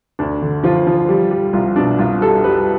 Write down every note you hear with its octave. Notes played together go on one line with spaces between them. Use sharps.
D2 D4
D3
F3 F4
F3
G3
G3
C2 F4
B2 D4
C2 F4
G3 A4
G3 B4